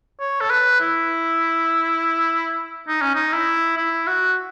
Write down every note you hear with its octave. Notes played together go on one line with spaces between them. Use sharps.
C#5
A4
B4
E4
D#4
C#4
D#4
E4
E4
F#4